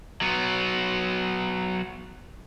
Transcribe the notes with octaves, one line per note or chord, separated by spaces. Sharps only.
F#3 B3